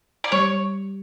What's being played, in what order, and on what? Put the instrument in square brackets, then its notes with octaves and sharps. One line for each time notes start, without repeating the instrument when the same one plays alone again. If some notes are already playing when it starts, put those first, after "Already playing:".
[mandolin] D5
[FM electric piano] G3 [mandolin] C#5